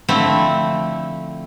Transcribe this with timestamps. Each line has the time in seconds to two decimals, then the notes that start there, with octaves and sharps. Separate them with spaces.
0.09 D3 F3 A3 C4 E4